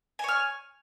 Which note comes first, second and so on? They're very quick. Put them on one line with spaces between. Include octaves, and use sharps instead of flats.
G#5 C#5 F6